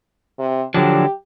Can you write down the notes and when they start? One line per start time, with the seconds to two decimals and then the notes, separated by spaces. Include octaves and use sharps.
0.39 C3
0.74 D3 F3 F#3 D4 G4